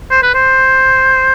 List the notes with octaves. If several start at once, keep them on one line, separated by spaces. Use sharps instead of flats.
C5
B4
C5